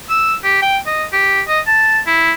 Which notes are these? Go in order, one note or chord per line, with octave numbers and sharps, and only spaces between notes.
E6
G4
G5
D#5
G4
D#5
A5
E4